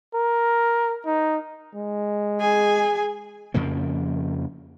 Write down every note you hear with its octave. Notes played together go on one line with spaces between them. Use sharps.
A#4
D#4
G#3
G#4 G#5
F2 C#3 F3 A#3